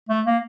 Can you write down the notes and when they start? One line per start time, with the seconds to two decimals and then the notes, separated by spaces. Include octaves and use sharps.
0.09 A3
0.26 A#3